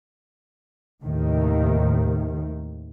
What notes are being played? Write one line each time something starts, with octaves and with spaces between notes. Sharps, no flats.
D#2 A2 C3 D#3